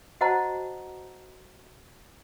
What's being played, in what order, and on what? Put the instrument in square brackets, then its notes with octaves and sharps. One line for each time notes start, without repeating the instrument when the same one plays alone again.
[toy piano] F#4 C5 D#5 F#5 A5 A#5